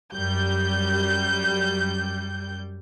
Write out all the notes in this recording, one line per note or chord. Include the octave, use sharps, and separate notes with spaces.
F#2 G3 G6